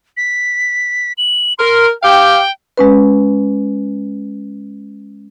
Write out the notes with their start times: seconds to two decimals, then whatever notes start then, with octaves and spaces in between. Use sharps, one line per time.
0.17 B6
1.18 F#7
1.58 A#4 C6
2.02 G4 F5 G5
2.77 G#3 C#4 B4